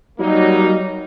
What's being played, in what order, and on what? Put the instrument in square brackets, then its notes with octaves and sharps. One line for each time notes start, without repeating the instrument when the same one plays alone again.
[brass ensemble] F#3 G3 A#3 D#4